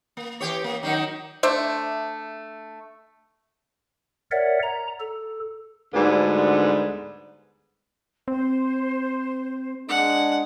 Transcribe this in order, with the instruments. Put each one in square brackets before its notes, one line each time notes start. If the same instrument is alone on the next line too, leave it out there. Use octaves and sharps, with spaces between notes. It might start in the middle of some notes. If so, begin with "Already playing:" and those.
[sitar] A#3
E3 G4 C#5
A#3
D#3 F#3 D#4
[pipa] A3 D4 C5 E5
[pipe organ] A#4 C#5 D5 E5 F#5
A#5
A4
[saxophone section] D2 G#2 D3 G3 B3
[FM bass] C4 [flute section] C5
[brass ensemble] G#3 D4 [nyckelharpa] F#5